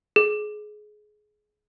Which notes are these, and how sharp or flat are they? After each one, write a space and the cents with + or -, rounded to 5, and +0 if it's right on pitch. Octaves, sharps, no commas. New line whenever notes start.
G#4 +25